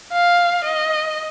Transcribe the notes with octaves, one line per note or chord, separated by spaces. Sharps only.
F5
D#5